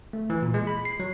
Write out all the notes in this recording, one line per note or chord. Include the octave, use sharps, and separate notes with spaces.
A3
E3
A#2
G#3
B5
C7
F#3